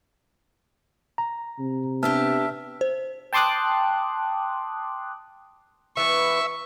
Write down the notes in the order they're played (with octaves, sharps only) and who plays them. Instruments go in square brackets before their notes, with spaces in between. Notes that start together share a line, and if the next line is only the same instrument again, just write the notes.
[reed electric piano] A#5
[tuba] C3
[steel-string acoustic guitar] B3 D4 G4 [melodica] E5 [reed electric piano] A5 F6
[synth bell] C5
[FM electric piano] G5 A5 C6 D6 D#6 F#6
[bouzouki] E3 B3 B4 [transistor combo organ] E5 [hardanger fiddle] C#6